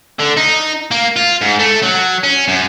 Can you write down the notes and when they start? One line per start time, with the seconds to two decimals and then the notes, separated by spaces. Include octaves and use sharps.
0.19 D3
0.37 D#4
0.91 A#3
1.16 F4
1.41 G#2
1.59 A3
1.83 F#3
2.24 C#4
2.48 F#2